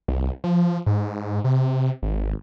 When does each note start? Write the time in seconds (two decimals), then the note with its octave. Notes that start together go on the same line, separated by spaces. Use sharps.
0.08 C2
0.44 F3
0.86 G#2
1.44 C3
2.03 G#1